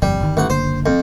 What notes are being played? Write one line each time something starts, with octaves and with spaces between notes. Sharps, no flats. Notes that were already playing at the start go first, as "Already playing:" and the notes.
G1 F2 G3
G1 D#3
A1 F#5
F#1 D3 A#3 C5
F2